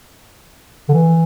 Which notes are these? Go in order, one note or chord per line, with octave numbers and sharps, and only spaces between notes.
D3
E3